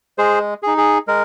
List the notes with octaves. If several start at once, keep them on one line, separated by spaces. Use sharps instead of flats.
G#3 G#4 C5
D#4 G#4
G#4
G#3 A#4